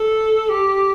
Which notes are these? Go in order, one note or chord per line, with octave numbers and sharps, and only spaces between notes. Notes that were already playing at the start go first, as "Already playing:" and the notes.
Already playing: A4
G4